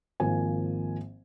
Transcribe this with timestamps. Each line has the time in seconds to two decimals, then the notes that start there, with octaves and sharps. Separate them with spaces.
0.20 G#1 F3 A#3 G#5